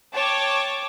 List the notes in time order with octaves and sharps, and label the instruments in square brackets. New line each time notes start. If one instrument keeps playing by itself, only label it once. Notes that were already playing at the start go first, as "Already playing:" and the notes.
[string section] C#5 G5 A5 D6